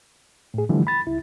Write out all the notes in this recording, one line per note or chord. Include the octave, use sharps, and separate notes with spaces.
A2 G#4
D3 E3 F3 G3 A3
B5 A6
C#2 E4